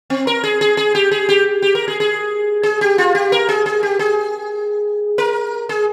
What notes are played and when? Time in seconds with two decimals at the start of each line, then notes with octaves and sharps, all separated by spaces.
0.10 C4
0.27 A#4
0.44 G#4
0.61 G#4
0.77 G#4
0.95 G4
1.11 G#4
1.29 G4
1.62 G4
1.75 A#4
1.88 G#4
2.00 G#4
2.63 G#4
2.81 G4
2.98 F4
3.15 G4
3.32 A#4
3.49 G#4
3.66 G#4
3.83 G4
3.99 G#4
5.18 A#4
5.69 G#4